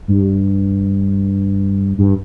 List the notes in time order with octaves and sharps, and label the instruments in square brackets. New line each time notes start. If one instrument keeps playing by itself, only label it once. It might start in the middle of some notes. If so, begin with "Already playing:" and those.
[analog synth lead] G2
G2